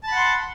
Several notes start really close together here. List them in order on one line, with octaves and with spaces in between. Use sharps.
A5 B5 F#5 C6